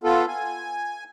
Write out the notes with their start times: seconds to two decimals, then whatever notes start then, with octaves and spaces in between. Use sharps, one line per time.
0.04 B3 F4 A4
0.28 G#5